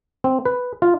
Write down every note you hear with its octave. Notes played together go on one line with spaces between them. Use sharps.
C4
B4
F4